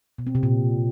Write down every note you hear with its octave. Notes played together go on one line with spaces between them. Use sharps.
B2
C4
C3
A#2